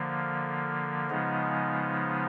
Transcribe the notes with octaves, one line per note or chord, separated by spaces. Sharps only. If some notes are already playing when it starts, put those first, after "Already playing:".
Already playing: D3 F3 A#3
C#3 F3 G#3 B3 D#4